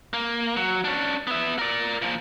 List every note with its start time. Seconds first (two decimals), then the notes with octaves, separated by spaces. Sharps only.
0.13 A#3
0.57 F#3
0.84 C#4 D4
1.27 B3 E5
1.59 A#4 D5
2.02 A#2 F3